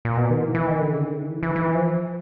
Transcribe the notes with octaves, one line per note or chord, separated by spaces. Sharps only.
A#2
B2
D#3
E3
E3
D#3
D3
C#3
D3
D#3
E3
E3
E3
F3